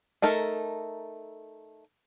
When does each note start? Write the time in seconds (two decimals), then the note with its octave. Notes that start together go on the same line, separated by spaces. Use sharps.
0.22 A3 D#4 A4 A#4